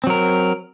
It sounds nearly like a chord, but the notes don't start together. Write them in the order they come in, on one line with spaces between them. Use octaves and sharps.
C4 F#3 A#4